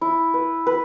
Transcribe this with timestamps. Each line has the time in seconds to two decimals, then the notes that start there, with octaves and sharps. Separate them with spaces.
0.01 E4
0.34 B4
0.67 B4